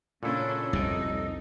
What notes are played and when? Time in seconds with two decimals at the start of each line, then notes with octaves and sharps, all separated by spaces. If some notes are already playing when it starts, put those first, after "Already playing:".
0.23 A#2 C#3 C#4 D4 E4 A4
0.73 C2 F2 C3 D#4